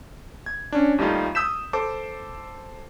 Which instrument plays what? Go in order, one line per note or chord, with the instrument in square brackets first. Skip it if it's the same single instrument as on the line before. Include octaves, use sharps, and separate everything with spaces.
[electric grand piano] G#6
C#4 D4
D#2 G3 A3 D#4 F4 F5
D#6 E6 G6 B6 E7
A4 C5 A5 D6